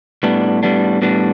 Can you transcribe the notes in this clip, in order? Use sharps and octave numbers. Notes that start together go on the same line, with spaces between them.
A2 G3 B3 D4
A2 G3 B3 D4
A2 G3 B3 D4